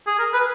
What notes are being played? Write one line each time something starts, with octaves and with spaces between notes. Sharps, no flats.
G#4
A#4
B4